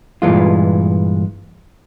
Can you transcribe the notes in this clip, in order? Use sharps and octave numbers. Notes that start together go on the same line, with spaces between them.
G2 A#2 E3 G#3 F4